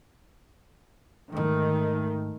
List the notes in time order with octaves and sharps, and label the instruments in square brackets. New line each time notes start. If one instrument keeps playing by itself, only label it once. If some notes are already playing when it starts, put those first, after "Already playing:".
[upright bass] D2 G#2 [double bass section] D#3 A3